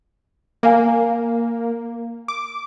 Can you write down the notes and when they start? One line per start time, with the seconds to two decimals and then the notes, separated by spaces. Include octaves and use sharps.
0.63 A#3 A#4 F5 G#5
2.28 D6